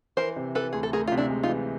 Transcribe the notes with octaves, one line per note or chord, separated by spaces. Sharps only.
E3 A#4 C5
C3
E3 A4 B4
D2 G#4
A4
D2 G#4 A#4
C3 F4
D4 E4
G#3
D#4 F4
E3